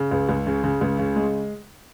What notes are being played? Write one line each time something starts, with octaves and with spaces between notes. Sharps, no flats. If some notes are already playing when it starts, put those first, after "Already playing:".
Already playing: C#3
C#2
C#2
C#3
C#3
C#2
C#3
G#3